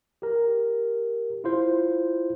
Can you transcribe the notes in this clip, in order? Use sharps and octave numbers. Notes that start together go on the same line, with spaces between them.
G4 A#4
E4 F4 C5